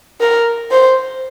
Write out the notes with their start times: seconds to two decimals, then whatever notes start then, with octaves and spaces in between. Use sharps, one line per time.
0.21 A#4
0.71 C5